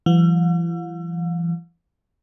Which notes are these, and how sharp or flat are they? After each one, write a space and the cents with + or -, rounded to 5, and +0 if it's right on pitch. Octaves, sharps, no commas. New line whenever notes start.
E3 +40 G3 -45 F5 +45